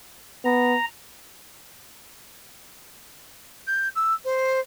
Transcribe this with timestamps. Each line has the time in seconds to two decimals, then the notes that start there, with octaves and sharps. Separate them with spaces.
0.45 B3 A#5
3.67 G6
3.96 E6
4.24 C5